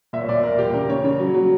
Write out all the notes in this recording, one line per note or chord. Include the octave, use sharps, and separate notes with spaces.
A#2 E5
C#5
A#2 D5
A#2 A#4
A#2 G4
C#3 A#4
C#3 C#5
C#3 C#5
F#3
F#3